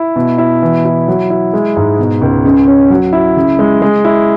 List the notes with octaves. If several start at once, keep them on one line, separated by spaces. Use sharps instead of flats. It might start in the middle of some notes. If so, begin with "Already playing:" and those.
Already playing: E4
B2
E4
E3
E4
F#3
E4
G#3
G#2
B2
C#2
C#3
C#4
F#3
E4
C#3
G#3
G#3
E4